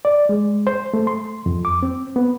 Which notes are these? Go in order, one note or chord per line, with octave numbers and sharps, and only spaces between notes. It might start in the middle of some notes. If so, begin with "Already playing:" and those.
D5
G#3
C5
A3
C6
F2
D6
C4
B3